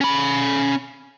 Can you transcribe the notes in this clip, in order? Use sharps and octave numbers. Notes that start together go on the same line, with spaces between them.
C#4 B5